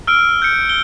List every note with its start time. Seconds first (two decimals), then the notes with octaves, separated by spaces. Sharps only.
0.07 E6 F6 D7
0.42 G6 C#7
0.69 G7